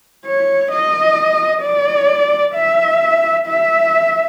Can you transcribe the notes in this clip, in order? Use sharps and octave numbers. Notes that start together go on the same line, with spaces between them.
C#5
D#5
D5
E5
E5